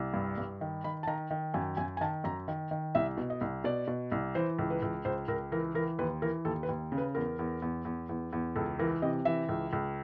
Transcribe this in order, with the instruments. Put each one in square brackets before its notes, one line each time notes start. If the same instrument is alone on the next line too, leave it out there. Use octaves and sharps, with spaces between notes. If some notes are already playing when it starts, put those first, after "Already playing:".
Already playing: [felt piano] C2
G2
G2
D#3
D#3 B5
A5
D#3 A#5
D#3
F#2 G#5
F#2 G#5
G#5
D#3 A5
F#2 A#5
D#3
D#3
C2 E5
B2
D#5
C2
B2 D5
B2
C2
E3 C5
C#2
B4
C#2
C#2 C5
C#2 A#4
E3 A#4
E3 A#4
D#2 B4
E3 A#4
D#2 A4
B4
D#2
C#3
B4
E2 A#4
E2
E2
E2
E2
E2
C#2 A4
E3 A#4
C3 D#5
E3 E5
C#2
C#2